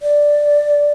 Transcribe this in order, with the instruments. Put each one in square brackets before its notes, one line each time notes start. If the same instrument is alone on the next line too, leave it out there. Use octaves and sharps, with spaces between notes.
[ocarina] D5